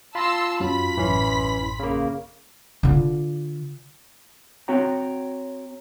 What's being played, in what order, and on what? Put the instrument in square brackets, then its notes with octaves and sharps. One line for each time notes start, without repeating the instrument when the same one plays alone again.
[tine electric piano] F4 [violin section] A5 C6 E6 [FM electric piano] B5 A#6
[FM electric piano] F#2 F#3 [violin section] B5 B6
[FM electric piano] A1 F#2 C6 [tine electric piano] E3 C#4
[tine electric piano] C#3 A#3
[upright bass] D3 F4
[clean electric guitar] C4 F#4 C#5 G5 A#5